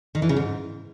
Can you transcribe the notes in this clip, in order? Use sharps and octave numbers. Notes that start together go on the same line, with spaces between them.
D#3
E3
C#3
G#2